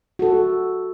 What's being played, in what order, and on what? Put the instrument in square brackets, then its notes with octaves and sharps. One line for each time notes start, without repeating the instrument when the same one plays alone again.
[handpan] F#4 A4